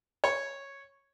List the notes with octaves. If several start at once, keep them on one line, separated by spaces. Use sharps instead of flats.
C#5